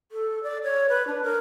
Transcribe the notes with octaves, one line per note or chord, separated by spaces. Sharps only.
A4
D5
C#5
B4
D4
A#4